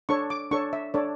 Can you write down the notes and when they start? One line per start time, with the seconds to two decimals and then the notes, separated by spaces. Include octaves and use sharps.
0.09 D4 A4 C#5 C#6
0.30 D6
0.51 D4 A4 C#5 C#6
0.73 E5
0.94 D4 A4 C#5 D5